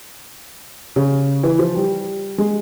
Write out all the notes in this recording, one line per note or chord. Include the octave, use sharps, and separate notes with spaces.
C#3
E3
F3
G3
G#3